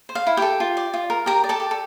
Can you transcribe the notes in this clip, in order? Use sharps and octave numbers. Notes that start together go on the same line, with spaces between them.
C5
F5
E4
G4 A4 G5
F4
D5
F4
A#4
G4 A#4 A#5
D5
A4 A5
G4
A4